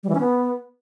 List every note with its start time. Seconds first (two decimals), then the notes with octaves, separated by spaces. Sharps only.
0.03 G3
0.09 E3
0.15 C#4
0.20 B3